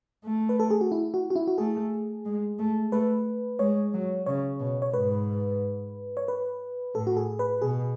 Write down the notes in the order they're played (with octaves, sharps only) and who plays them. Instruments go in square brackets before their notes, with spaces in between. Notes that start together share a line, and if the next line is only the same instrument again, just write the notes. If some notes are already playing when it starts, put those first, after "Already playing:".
[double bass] A3
[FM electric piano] B4
A4
G#4
F#4
E4
F#4
F#4
E4
F#4
[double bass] A3 [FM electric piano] G#4
[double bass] G#3
A3
[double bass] A3 [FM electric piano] B4
[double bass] G#3 [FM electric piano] C#5
[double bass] F#3
[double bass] C#3 [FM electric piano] C#5
[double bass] B2
[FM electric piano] C#5
[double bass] G#2 [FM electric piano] B4
[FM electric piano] C#5
B4
[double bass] A2 [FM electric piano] A4
[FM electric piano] F#4
G#4
B4
[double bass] B2 [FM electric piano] G#4